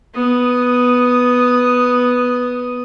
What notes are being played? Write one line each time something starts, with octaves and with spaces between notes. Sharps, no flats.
B3 D#6